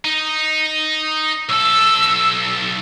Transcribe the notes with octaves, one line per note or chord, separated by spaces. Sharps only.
D#4
B1 A4 E6